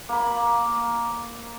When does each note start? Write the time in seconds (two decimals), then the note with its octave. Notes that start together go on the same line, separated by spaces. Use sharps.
0.09 A#3 B5